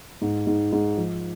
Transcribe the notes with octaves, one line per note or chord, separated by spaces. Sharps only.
G#2
G#2
G#2
F3